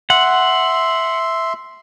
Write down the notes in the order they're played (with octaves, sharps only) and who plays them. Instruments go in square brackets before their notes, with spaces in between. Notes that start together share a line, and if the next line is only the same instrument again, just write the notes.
[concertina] E5 C6 [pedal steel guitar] F#5